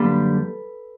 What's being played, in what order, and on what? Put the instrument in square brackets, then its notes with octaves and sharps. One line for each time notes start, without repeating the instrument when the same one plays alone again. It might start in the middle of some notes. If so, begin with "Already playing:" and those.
Already playing: [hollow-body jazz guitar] F#2 D3 G3 A#3 A4 B4